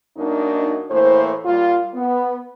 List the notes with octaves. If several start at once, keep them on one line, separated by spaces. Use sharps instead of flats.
F#2 A#3 D4 D#4
A2 E3 A#3 C5
A#2 G3 F4
B3